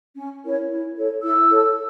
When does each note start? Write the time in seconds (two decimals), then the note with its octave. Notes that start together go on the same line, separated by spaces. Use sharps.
0.16 C#4
0.44 E4 A#4 C#5
0.70 E4
0.97 A4 C#5
1.23 E4 E6
1.51 A4 C#5